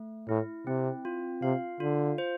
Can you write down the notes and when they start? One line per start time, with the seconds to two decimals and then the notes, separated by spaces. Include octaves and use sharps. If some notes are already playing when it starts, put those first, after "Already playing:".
Already playing: A3
0.29 A2 E4
0.67 C3 C4
1.05 F4
1.42 C3 F5
1.80 D3 F4
2.18 C5